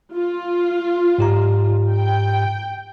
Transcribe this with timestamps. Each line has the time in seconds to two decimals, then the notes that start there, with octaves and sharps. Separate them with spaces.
0.14 F4
1.18 G#2 G4 A#5
1.93 G5